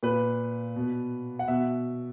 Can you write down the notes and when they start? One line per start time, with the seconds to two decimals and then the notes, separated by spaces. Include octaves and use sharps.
0.03 A#2 B4
0.76 B2
1.39 F#5
1.48 B2 E5